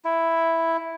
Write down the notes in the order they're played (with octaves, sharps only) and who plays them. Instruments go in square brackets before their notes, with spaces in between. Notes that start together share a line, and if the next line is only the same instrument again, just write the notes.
[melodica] E4